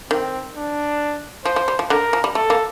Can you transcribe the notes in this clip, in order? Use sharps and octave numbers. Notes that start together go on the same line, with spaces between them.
D#3 C4
D4
F3 C5
F3
G3
F3
D3 A#4
F3
G3
A3 A4
A#3